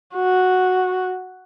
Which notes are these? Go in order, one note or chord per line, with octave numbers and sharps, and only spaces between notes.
F#4